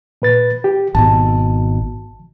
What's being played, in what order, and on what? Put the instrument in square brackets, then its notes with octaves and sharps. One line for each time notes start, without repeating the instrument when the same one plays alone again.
[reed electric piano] A#2 B4 A6
G4
[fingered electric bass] G#1 B2 [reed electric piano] A5